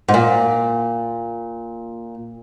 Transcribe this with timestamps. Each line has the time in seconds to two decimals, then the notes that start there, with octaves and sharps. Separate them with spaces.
0.08 G#2
0.14 A#2